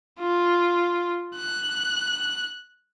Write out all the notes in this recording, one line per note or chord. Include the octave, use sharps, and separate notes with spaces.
F4
F#6